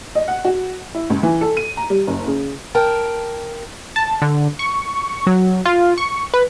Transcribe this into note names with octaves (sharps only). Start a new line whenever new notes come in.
D#5
F#5
F#4
E4
C#2
E3
A4
D#7
A#5
G3
F#1
C#3
A#4 G5 A5
A5
D3
C#6
F#3
F4
C#6
B4